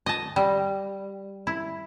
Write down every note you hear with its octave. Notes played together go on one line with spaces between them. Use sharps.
D#5 A5
G3
E4